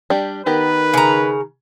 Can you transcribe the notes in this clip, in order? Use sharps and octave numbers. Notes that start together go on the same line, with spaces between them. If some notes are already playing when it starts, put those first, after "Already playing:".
G3 D4 G4
D#3 B3 G4 A#4 B4
C#3 A#5